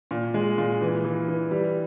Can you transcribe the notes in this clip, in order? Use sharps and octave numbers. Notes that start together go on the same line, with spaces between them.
A#2
G#3
A#2
E3
E3
E3
G3